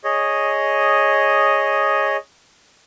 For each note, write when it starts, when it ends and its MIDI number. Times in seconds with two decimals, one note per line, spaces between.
0.04 2.17 68
0.04 2.17 73
0.04 2.17 75